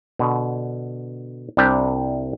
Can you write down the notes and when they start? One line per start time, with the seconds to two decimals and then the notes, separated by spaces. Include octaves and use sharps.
0.19 B2 D3
1.57 C2 C3 G3 D4 G4